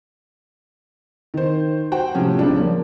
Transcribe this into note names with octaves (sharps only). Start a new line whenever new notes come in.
D#3 C5
F#4 C5 F#5 G5
A2 C3 F3 C#4
A#1 C#3 D4
F3 A#3